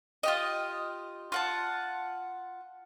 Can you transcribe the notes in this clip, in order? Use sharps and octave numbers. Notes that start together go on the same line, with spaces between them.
F4 G4 D#5
F4 F#5 A5